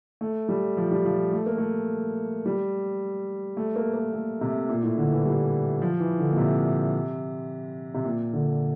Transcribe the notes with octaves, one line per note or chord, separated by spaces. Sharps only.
A3
G3
F3
G3
F3
A3
A#3
A3
G3
A3
A#3
A#3
A3
C3
A#2
A2
D3
E3
G3
F3
E3
D3
A#2
C3
C3
A#2
D3